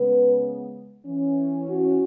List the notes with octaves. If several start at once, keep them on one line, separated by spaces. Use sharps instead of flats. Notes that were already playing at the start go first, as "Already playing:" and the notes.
Already playing: C#3 G#3 B3 B4
E3 C#4
F#4